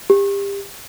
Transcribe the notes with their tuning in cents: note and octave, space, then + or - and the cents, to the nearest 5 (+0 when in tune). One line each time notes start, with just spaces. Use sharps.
G4 +30